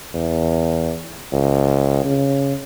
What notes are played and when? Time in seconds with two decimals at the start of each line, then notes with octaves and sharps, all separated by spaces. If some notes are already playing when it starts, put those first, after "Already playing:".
0.14 E2
1.32 C#2
2.04 C#3